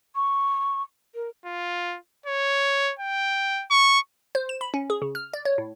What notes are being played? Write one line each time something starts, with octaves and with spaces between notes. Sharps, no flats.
C#6
A#4
F4
C#5
G5
C#6
C5
E7
B5
C#4
G#4
C#3
F6
D5
C#5
A2